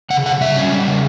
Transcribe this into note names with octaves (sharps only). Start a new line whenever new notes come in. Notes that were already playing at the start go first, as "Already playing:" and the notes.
C#3 F#5
C#3 F#5
G3 E5
C#4
G3
C#3